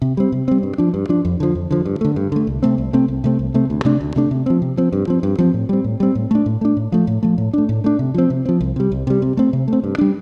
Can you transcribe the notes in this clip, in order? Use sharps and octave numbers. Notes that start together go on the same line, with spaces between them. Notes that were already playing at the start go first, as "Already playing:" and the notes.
C3
G3 C4
C3
G3 C4
G2
F3 D4
G2
F3 D4
F2
D3 F3
F2
D3 F3
G2
D3 A3
G2
D3 A3
C2
C3 A3 C4
C2
C3 A3 C4
C2
C3 A3 C4
C2
C3 A3 C4
D2
C3 A3 D4
D2
C3 A3 D4
C3
F3 C4
C3
F3 C4
G2
F3 C4
G2
F3 C4
A2
G3 C4
A2
G3 C4
A2
A3 D4
A2
A3 D4
A2
F3 A3
A2
F3 A3
A2
A3 D4
A2
A3 D4
C3
F3 C4
C3
F3 C4
C2
C3 G3
C2
C3 G3
C3
A3 C4
C3
A3 C4
G2
G3 D4